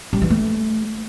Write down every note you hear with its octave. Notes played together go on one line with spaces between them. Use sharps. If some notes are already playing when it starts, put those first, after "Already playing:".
G3
E3
A3